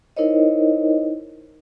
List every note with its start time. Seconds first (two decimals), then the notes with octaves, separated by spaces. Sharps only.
0.17 D#4 E4 A#4 C5 C#5 D#5